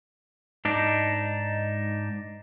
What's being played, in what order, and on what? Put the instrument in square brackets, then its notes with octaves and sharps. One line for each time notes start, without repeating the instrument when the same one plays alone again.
[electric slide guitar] G#2 D4 D#4